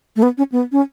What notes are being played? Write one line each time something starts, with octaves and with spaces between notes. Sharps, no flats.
A3
B3
C#4
B3
C#4